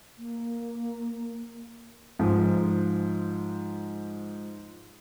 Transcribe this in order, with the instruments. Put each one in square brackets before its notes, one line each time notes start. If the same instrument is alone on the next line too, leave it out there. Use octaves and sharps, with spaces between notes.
[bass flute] A#3
[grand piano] G#2 F3